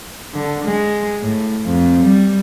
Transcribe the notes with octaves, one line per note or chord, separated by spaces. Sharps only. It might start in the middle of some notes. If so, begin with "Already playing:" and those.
D3
G#3
A2
F2
G3